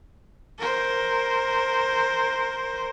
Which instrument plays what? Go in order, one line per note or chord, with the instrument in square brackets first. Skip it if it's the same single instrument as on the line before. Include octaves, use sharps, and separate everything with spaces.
[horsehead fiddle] A#4 C5